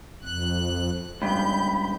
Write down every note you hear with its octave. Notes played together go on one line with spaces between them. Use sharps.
F2 F#6
C#2 G2 B5 G6